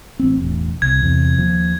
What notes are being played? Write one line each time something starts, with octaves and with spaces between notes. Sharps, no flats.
A1 C4
E1 A1
C2 G#6
E2 C3
D#2 F3